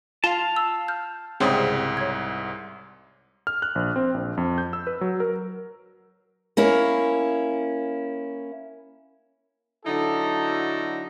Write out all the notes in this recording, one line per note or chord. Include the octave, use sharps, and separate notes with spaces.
F4 F5 A5 G7
E6
F6 G6
C2 G#2 C#3 G3 C4 G#4 C#5 D#6
C#5 G#6
F6
F#6
A#1
C4
A#1
F2
G6
E6
B4
F#3
A#4
A#3 C#4 E4
D3 F#3 D#4 E4 A4